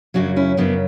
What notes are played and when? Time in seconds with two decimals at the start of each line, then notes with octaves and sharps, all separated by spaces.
0.14 F#2 C#3 F#3 D4 F#4
0.36 C#4 E4
0.57 F#2 C#3 F#3 B3 D4